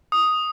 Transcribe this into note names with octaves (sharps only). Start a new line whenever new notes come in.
D#6